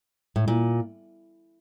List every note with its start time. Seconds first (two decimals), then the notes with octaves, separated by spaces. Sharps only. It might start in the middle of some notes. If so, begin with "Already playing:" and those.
0.36 A2
0.48 A#2